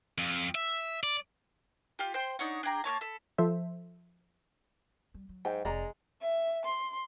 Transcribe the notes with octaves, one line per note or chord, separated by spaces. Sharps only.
F2
E5
D5
F4 G4
C5 G5 C6
D4 D#4 C#5 F#5
D4 G#4 G5 A#5
A#3 B3 C#5 A5
A4 B5
F3 A4 C5 E5
G3
F#3
G#2 G5
F1 G#3 D5 A#5
E5
C6